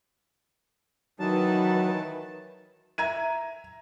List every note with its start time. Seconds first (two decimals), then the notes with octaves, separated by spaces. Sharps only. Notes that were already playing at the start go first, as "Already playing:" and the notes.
1.20 D#3 E3 F#3 D#4 B4 A5
2.98 E5 A#5 G#6 D#7